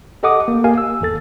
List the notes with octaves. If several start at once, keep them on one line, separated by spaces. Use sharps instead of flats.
G4 A4 D#5 F#5 D6 D#6
A#3
A#3 G4 F5 G#5
E6
G#1 E2 A4 A6